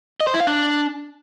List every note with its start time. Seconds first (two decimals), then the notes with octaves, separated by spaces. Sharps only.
0.20 D#5
0.27 C5
0.34 E4
0.40 F5
0.47 D4